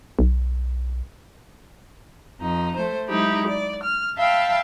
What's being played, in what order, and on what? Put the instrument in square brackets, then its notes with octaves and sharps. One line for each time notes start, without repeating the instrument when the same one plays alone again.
[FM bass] B1
[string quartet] F2 D#4
A3 C5
F#3 G#3 D#4 E4 G4
D5
F6
E5 F5 G5 A5 B5 E6